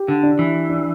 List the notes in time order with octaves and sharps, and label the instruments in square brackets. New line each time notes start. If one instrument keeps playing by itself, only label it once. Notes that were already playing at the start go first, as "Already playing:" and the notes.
Already playing: [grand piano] G4
[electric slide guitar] D3
[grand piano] D4
[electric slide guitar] E3
[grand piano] D4